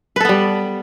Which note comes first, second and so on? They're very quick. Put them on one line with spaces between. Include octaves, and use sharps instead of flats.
B4 A4 B3 G3